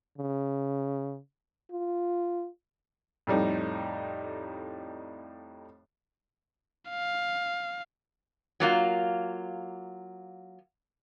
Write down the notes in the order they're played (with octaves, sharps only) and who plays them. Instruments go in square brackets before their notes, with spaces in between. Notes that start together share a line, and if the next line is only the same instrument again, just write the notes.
[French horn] C#3
F4
[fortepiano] F2 A2 G3 D#4
[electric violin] F5
[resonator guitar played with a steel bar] F#3 A#3 F4